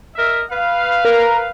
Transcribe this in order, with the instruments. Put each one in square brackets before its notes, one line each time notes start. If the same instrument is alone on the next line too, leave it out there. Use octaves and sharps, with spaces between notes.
[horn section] A#4 D#5 E5
B4 F5
[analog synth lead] A#4